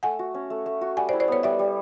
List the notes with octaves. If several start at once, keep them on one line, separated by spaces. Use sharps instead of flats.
A3 F#5 G#5
F#4
C#4
A3
A3
F#4
G3 F#5 G#5
C5 D5
E4
C5 D5
B3 B4 C#5
G3 D5 E5
G3